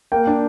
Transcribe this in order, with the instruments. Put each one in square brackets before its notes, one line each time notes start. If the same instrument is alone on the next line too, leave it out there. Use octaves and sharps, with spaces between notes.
[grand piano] A#3 G5
D4